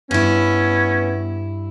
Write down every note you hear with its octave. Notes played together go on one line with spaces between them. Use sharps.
G2 B3 C#4 E4